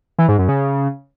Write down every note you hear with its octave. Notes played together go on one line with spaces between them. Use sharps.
E3
G#2
F#2
C#3